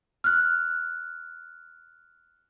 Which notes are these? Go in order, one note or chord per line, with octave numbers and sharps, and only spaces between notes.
F6 F#6